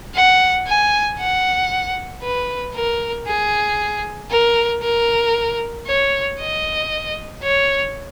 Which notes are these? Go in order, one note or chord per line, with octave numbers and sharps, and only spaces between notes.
F#5
G#5
F#5
B4
A#4
G#4
A#4
A#4
C#5
D#5
C#5